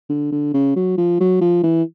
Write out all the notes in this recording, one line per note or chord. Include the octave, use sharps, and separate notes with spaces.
D3
D3
C#3
F#3
F3
F#3
F3
E3